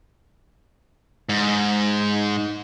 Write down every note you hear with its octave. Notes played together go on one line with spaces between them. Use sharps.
G#2